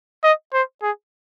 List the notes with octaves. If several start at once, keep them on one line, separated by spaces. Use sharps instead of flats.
D#5
C5
G#4